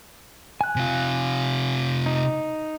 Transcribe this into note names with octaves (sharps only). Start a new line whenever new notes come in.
G#5 F#6
C3 F4
D#4